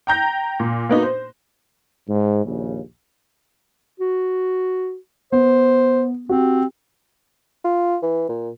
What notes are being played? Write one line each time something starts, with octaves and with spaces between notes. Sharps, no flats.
G5 A#5 G6 A#6
A#2
A#3 B3 D#4 F#4
C5
G#2
A#1 D#2 C#3
F#4
B3 C5
C4 F#4 G4
F4
E3
A#2